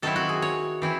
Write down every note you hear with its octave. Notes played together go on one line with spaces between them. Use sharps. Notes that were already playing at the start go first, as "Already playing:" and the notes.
D#3 F#3 C4 E4 A4
F#4
G#4
C#5
E3 C4 E4